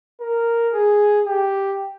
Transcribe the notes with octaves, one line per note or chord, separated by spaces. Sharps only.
A#4
G#4
G4